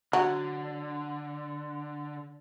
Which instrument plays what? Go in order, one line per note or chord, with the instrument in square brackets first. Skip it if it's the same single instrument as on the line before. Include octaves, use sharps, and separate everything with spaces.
[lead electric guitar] D3 [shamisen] F#3